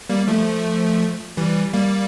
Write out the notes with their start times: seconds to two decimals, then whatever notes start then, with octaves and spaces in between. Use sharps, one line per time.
0.10 G3 A#3
0.28 F3 A3
1.37 E3 G3
1.73 G3 A#3